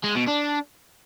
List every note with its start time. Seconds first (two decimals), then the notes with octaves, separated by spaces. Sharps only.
0.04 G#3
0.15 B2
0.27 D4